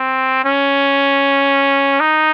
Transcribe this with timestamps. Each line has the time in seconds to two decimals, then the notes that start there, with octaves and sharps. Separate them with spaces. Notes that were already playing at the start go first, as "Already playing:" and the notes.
Already playing: C4
0.45 C#4
2.00 D#4